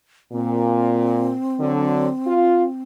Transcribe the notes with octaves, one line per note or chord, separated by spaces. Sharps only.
A#2 C4
D3 F#3
F4